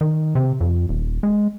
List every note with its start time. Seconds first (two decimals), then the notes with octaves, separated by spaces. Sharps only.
0.01 D#3
0.35 C3
0.61 F2
0.89 D#1
1.23 G#3